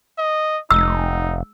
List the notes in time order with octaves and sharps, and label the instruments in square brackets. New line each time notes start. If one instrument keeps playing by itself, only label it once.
[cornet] D#5
[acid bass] F1 [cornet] D#4 [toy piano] E6